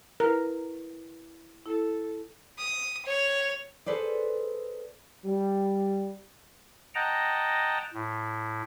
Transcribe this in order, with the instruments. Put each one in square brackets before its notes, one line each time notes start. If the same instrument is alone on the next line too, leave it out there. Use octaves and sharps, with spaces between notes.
[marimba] E4 B4 [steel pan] A#4
[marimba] E4 [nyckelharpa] A4
[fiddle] D#6
C#5
[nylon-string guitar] G#4 A4 B4 C5 D5
[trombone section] G3
[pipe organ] D#5 F#5 G5 A5 A#5
A2